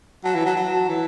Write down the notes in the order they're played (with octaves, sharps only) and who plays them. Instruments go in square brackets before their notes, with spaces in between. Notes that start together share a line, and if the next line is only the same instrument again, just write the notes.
[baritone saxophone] F#3 [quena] A5
[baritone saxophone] E3
F#3
F#3
E3